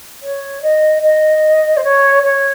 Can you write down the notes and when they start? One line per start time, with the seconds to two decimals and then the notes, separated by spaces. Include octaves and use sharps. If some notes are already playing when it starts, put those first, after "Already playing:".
0.22 C#5
0.62 D#5
1.02 D#5
1.76 C5
1.83 C#5
2.22 C#5